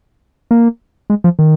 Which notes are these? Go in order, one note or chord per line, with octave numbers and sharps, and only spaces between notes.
A#3
G#3
F3
D#3